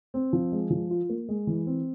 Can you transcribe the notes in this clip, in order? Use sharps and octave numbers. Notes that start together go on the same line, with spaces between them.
C4
F3
G#3
F3
F4
A#3
G#3
E3
C4